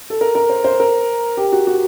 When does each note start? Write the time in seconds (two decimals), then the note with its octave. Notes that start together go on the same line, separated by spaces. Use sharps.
0.10 A4
0.21 A#4
0.35 A#4
0.49 C5
0.64 C5
0.80 A#4
1.37 G4
1.52 F#4
1.67 F#4